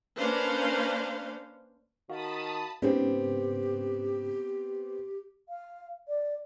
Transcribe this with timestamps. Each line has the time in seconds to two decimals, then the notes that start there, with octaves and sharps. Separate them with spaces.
0.16 A#3 C#4 D4 B4 C5 F5
2.10 D#3 F#4 F5 A5 B5 D#6
2.82 G#2 C#3 B3 C4 G4
5.49 F5
6.08 D5